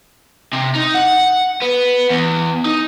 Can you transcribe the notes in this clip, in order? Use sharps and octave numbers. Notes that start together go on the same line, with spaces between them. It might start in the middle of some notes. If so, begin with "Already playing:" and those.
C3
D#4
F#5
B3
E2
D#4